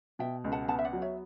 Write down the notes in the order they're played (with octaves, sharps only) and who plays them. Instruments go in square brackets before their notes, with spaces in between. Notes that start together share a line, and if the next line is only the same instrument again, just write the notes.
[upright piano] B2 [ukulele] E5 G5
[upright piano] C#2
[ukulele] F#5 A5
[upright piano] B3 [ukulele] F#5 A5
[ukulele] E5
D5 F#5
[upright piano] F#3
[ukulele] C#5 E5